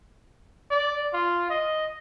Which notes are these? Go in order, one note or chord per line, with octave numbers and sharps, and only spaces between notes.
D5
F4
D#5